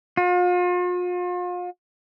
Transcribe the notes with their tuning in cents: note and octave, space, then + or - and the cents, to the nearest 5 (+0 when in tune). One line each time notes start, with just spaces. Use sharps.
F4 +40